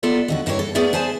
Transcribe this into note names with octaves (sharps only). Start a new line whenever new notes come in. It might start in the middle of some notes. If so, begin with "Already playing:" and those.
B3 F4 A4 A#4 D5 E5
D#2 D3 F#4
G2 A#3 E4 G4 A4 C#5
A4
A3 B3 G#4 D5 E5
G#4 C5 G#5 A5